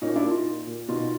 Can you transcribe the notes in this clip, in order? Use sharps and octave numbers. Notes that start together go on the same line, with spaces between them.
A#2 C#4 D#4
D4 E4
A#2
D#4 F4
A#2
A#2
B2 D#4 F4